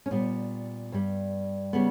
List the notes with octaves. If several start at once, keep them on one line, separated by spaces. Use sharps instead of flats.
C#4
A#2 G3 B3
G2 G3
C#3 G3 B3